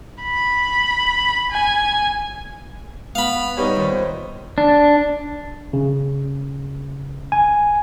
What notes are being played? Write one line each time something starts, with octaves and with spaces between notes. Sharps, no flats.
B5
G#5
B3 F5 B5
G3 B3 D#4 C#5
D#1 C5
D4
C#3
G#5